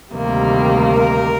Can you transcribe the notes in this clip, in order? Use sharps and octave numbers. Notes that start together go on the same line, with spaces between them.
D2 C3 D#3 G3 A#3
A#4